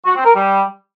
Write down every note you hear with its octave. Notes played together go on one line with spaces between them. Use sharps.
F#4
C4
A#4
G3